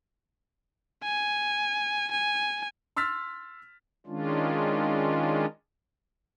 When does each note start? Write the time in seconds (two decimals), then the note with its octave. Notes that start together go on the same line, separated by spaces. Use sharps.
1.03 G#5
2.11 G#5
2.97 C6 E6 F6 A6 B6
4.07 D#3 G#3 C#4 D4 F4